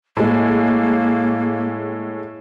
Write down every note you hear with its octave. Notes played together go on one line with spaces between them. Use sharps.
A2 G#3 A#3